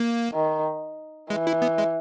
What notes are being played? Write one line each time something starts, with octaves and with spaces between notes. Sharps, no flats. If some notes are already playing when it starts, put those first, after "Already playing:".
Already playing: A#3
D#3
E3 G#3
E4
B3
G#3